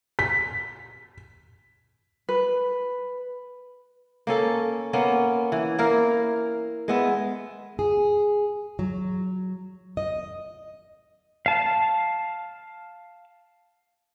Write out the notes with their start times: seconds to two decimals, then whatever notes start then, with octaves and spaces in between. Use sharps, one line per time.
0.19 B6
2.29 B4
4.27 A#3 C#4 A4
4.93 A#3 B3 C#4
5.52 E3
5.79 A#3 E4 A#4
6.88 G#3 B3 E5
7.79 G#4
8.79 F#3
9.97 D#5
11.46 F5 A5